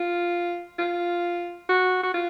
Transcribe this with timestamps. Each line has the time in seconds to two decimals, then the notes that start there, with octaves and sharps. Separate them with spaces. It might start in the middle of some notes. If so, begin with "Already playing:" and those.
Already playing: F4
0.79 F4
1.69 F#4
2.03 F#4
2.14 F4